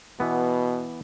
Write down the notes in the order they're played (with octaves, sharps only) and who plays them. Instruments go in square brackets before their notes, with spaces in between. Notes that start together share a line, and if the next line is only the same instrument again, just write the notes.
[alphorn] B2 [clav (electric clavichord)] E3 B3